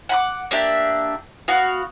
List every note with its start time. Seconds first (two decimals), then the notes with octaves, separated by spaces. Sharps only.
0.09 F#5 B5 D6
0.51 A#3 D4 G4 E5
1.48 B3 F#4 F5